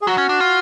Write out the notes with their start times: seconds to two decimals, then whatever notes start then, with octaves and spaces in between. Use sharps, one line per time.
0.02 G#4
0.07 F#3 F#4
0.18 C#4
0.29 D4
0.40 F4